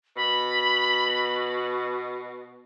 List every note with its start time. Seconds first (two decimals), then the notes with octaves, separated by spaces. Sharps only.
0.16 B2 B5